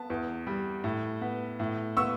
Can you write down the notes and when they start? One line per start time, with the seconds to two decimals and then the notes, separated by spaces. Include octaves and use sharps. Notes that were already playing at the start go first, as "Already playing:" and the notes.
Already playing: B3 A5
0.10 E2
0.47 G3
0.84 A2
1.22 B3
1.60 A2
1.97 B3 C#6 E6